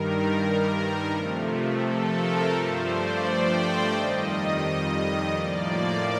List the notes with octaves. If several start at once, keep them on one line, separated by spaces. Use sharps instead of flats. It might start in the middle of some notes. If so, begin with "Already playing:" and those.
Already playing: G2 D#3 G3 A#4
C3 F3 A3
A4
A#4
G2 F3 A3 C5
D5
G5
F2 D#3 G3 D#5
D#5
A2 F3 A#3 D5